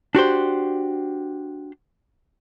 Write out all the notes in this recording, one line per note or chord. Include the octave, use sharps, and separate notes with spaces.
D4 F#4 G4 C5